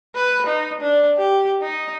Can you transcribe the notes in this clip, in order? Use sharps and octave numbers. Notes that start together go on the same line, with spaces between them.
B4
D#4
D4
G4
D#4